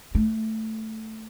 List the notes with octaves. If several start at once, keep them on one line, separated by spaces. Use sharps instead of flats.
A3